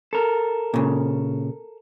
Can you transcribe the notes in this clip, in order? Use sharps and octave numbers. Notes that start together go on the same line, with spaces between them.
A4 A#4
A#2 C#3